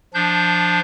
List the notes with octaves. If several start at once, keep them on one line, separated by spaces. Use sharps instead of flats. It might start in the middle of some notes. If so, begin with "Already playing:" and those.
F3 D4 G6